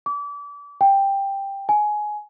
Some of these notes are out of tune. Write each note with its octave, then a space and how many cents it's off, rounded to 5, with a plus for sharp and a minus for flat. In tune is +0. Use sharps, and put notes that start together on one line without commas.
D6 -30
G5 +10
G#5 +15